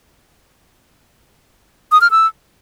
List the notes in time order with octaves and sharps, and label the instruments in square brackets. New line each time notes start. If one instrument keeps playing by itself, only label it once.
[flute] D#6
F6
E6